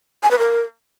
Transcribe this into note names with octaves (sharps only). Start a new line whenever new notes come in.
G#5
B4
A#4